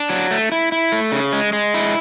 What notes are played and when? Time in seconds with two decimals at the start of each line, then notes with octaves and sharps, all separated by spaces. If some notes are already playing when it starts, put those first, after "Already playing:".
Already playing: D4
0.10 F#3
0.31 A3
0.52 E4
0.72 E4
0.92 A3
1.12 C#3
1.33 G#3
1.53 G#3
1.74 E4